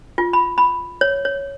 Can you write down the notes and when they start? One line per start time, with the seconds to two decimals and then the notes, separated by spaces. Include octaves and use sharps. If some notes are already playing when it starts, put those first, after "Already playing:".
0.18 F4
0.33 B5
0.58 B5
1.01 C#5
1.25 C#5